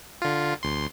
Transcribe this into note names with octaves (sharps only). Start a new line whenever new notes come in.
D3 F4
D2 C6